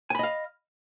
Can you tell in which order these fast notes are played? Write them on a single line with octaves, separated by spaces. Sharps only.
G#5 B5 D#5 F5